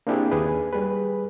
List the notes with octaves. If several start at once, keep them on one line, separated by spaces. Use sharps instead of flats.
A#3 C4 D4 E4 G4 G#4
D#2 G#4 B4
G3 G#4 B4